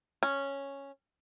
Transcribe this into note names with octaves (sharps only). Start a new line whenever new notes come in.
C#4